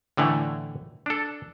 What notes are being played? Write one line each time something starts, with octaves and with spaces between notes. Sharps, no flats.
A2 D3 E3 A3
D4 A4